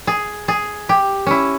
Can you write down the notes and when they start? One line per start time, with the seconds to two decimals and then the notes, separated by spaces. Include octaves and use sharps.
0.07 G#4
0.48 G#4
0.89 G4
1.26 C#4 E4